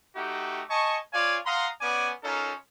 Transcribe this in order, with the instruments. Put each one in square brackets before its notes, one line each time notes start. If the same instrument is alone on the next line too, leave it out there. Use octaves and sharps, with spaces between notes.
[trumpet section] A3 D#4 F#4 G4
D#5 G#5 A5 C#6
F4 C#5 D5 F5 G#5
F5 F#5 A#5 C6 D#6
B3 C#4 D5 G#5 D6
C#4 D#4 F4 A4 A#4